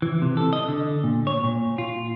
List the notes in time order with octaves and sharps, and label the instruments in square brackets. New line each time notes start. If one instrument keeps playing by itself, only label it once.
[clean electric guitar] E3
C3
A4
D#5
D3
A#2
C#5
A#2
F4